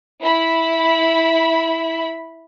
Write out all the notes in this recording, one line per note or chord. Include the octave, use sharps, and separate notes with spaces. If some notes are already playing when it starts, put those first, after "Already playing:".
E4 B5